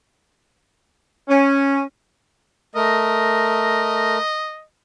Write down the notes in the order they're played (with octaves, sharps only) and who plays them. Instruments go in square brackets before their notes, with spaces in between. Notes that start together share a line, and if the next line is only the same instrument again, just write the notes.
[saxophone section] C#4
[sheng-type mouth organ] A3 A#4 [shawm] D#5